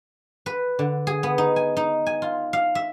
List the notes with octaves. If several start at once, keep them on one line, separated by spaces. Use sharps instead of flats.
B4
D3
G#4
B3
D#4
G#5
D#4
G#5
F4
F5
E5